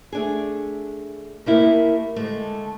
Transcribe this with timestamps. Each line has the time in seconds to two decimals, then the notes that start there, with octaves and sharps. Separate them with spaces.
0.12 A3 D4 G#4
1.46 A3 A#3 E4 F#4 G4 A#4
2.16 D3 G#3 A3